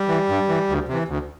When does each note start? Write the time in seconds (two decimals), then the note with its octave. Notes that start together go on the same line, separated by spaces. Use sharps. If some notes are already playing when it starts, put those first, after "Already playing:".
Already playing: G3
0.08 E3
0.29 G2
0.49 E3
0.69 D2
0.88 C3 E3
1.08 D2